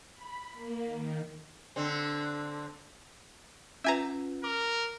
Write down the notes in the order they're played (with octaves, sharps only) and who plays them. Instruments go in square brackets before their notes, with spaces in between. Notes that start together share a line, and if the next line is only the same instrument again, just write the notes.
[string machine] B5
A#3
D#3
[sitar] D3 C4
[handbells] C#4 F4 B4 [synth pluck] E5 G#5 A#5
[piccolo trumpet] A#4 [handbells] D6